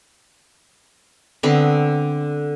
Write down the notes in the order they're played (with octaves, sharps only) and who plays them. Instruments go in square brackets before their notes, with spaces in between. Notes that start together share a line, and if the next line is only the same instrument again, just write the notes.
[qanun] D3 B3 C4